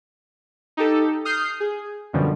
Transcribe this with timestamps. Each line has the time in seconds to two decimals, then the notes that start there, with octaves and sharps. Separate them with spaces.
0.77 D#4 G4 A4
1.25 D#6 F6 G6 C7
1.60 G#4
2.13 F#2 B2 D3 F3 G3